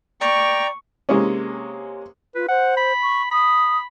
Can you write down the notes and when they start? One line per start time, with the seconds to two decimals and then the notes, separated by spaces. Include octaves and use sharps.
0.21 D5 G5 A#5 C#6
1.09 C3 G#3 A#3 C#4
2.35 F4 B4
2.49 C5 F#5
2.77 B5
3.02 C#6
3.31 B5 D#6